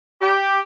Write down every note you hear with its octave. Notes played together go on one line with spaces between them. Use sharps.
G4